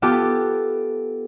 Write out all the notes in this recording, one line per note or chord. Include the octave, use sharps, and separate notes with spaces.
B3 F4 G4 A4